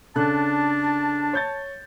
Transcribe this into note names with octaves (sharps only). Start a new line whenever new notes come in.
C#3 D4 A4 A5 F#6
C#5 G6 A6